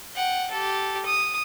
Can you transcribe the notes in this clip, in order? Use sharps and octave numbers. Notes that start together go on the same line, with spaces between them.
F#5 G5
G4 A4
D#6